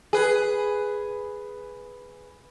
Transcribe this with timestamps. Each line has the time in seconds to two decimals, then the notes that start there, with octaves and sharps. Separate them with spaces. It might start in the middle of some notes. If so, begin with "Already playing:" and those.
0.13 G#4 B4